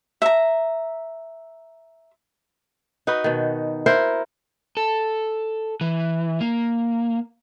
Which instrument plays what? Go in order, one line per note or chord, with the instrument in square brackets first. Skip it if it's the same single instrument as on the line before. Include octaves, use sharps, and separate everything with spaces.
[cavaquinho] E5 A#5
[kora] D#4 F#4 B4
B2 D#3
E4 A#4 C5 F#5
[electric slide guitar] A4
E3
A#3